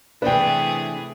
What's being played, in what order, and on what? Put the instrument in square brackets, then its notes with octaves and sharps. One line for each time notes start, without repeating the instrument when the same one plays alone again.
[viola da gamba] C3 A3 G#4 [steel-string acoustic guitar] E3 D4 [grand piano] B4 G5